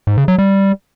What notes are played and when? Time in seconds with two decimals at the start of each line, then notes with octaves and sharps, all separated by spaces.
0.07 G#2
0.18 C#3
0.28 F#3
0.38 G3